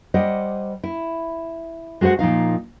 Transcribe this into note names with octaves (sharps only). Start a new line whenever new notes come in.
G3 C5 D5 D#5 F#5
E4
G#3 F#4 A4 C5 F#5
A#2 F3 D#4 F5